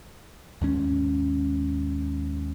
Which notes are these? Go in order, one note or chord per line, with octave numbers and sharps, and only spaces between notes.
D#2 G#2 C#4